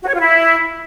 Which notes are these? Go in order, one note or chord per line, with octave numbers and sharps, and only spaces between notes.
F#4
C#5
F4
E4